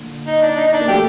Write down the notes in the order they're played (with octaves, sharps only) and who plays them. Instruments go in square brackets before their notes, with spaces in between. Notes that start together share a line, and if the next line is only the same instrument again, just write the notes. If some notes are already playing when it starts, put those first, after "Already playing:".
Already playing: [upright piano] A#2 D3
[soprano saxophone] D#4
D4
D#4
D#4
D4
[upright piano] A#3
[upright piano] F#3 A3 [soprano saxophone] G4